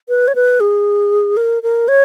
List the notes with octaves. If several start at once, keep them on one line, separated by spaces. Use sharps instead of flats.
B4
C#5
B4
G#4
A#4
A#4
C#5